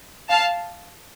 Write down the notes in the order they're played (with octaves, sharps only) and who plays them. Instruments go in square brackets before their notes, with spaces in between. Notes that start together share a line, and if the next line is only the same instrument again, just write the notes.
[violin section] F5 A5